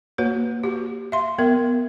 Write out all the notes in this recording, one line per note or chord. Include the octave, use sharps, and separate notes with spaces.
A#3 F#4 B4 C#5
F#4 G4
E5 F5 C6
B3 A#4 E5